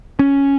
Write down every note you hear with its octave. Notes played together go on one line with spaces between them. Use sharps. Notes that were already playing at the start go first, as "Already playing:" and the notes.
C#4